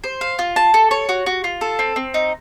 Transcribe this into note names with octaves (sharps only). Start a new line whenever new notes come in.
C5
F5
F4
A5
A4
C#5
F#4
F#4
F4
A4
C4
C4
D#4